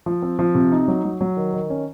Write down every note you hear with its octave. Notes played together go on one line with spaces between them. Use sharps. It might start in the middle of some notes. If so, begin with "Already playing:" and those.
F3
C4
F3
C3
D#4
F#3
F#3
F#3
D#3
D#3
C#4